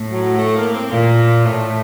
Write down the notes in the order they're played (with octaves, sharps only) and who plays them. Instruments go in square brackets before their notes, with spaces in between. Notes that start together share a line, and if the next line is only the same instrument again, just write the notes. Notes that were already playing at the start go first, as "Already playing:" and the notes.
Already playing: [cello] A2
[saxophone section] F#3
A3
A#3
C4
[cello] A#2 [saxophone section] A#3
[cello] A2 [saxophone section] A3